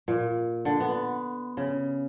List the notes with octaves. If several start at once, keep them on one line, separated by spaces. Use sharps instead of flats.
A#2
D3
B3
C#3